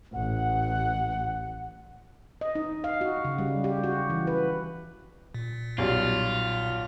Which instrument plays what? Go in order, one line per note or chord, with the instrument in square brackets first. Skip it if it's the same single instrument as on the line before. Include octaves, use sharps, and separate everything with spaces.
[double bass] A1 [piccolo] F#5
[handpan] D#5
D#4
F5
F#4
C#3
G3
G4
F#4
E3
B4
[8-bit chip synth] A#2
[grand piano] B1 G3 [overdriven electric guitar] F4